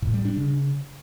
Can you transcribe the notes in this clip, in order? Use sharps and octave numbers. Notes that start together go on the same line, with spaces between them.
A2
G3
D4
C#3